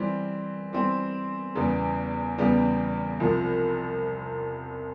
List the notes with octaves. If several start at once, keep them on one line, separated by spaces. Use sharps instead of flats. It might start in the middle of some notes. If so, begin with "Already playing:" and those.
Already playing: E3 G3 C4
E3 G3 C4
E2 C#3 E3 G3 B3
E2 C#3 E3 G3 B3
C2 C3 F3